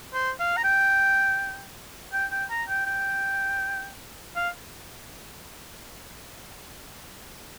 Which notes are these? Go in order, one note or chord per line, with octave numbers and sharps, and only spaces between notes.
C5
F5
A#5
G5
G5
G5
A#5
G5
G5
F5